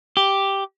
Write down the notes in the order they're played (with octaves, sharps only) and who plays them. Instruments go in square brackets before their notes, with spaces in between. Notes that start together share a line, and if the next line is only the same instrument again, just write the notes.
[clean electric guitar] G4